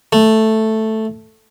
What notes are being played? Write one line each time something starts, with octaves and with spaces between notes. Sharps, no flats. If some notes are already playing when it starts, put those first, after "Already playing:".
A3